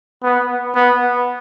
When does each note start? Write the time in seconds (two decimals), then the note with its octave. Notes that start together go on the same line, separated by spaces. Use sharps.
0.23 B3
0.75 B3